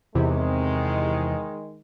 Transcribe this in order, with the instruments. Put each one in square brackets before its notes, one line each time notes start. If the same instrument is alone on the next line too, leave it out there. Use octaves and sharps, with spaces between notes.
[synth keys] E2 C3 E3 [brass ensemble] D#3 G#3